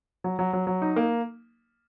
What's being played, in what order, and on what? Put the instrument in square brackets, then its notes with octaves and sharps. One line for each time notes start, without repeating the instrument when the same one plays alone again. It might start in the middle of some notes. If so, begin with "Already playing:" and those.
[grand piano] F#3
F#3
F#3
F#3
D#4
A#3